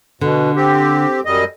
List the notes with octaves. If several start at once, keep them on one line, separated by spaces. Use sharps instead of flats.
B2 D3
C4 G4
F#2 G3 D#5